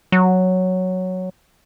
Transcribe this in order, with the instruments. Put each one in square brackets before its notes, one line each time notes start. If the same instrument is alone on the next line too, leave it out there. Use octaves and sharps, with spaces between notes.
[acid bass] F#3